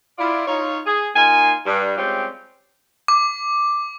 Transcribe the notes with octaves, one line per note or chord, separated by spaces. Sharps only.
E4 F4 D5
D#4 F4 C#5
G#4
A#3 D#4 F4 G#5
G2
G3 G#3 C4 C#4 F4 G4
D6